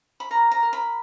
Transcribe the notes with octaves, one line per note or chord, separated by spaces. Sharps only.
B5
A#4 A#5
A#5
A#4
B5